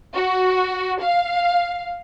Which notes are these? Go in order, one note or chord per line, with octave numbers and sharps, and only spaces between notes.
F#4
F5